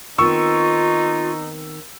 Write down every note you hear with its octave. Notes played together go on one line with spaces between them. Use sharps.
D#3 B3 C4 D#4 F4 C#6 E6